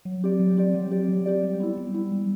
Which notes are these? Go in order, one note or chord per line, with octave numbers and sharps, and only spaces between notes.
F#3
C4 G4 D5
F#3
C4 G4 D5
F#3
C4 G4 D5
F#3
C4 G4 D5
G3
B3 E4
G3
B3 E4
G3